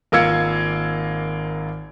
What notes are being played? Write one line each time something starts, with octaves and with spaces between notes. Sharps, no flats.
G#1 A#3 F4 E6 G#6 C#7